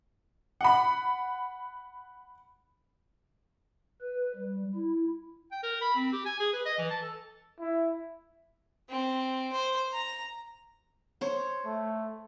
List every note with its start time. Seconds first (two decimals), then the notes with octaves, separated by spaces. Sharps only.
0.61 F#5 B5
4.01 B4
4.36 G3
4.75 E4
5.52 G5
5.63 A#4
5.81 B5
5.95 C4
6.13 G4
6.25 G#5
6.40 G#4
6.53 B4
6.65 D#5
6.78 E3
6.90 A5
7.02 A4
7.60 E4
8.89 C4
9.52 C5
9.93 A#5
11.21 C5 C#5
11.65 A3